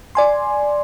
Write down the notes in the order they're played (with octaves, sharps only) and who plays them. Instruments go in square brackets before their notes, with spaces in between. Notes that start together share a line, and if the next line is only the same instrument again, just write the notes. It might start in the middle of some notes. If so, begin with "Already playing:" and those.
[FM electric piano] D5 G#5 C6